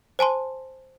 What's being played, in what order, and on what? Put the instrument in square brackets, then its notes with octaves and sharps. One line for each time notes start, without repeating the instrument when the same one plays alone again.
[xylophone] C5 G#5 A5 C6